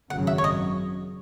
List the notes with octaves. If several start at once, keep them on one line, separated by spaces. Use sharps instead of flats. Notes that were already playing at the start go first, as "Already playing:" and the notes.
G#1 F#2 C#3 F#3 F#5
E5
C#5
D#5